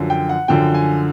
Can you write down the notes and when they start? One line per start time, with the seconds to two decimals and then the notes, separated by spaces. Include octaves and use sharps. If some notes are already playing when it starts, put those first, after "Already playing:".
Already playing: F#2 D3 F3
0.10 G5
0.29 F#5
0.48 F#2 D3 F3 G5
0.74 G#5